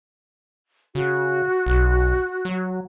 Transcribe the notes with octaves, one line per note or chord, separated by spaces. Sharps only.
C#3 F#4
B1
F#3